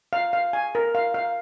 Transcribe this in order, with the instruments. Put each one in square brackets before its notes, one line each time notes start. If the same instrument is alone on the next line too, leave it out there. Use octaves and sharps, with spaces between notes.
[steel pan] F5
F5
G#5
A#4
F5
F5